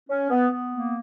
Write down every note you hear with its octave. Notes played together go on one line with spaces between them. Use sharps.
C#4
B3
B3
A#3